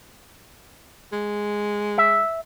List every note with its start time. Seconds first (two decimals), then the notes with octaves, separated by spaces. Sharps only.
1.12 G#3
1.98 E5